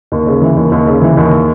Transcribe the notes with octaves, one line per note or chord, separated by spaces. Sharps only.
D#2
C#3
E3
D#2
D#2
C#3
E3
D#2